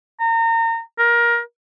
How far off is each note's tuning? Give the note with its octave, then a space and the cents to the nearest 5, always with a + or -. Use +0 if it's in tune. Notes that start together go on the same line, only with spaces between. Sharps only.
A#5 -35
A#4 +20